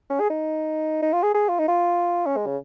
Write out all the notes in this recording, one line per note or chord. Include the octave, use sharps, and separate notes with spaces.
C#4
G#4
D#4
D#4
F4
G#4
G#4
F4
D#4
F4
C#4
G#3
C#3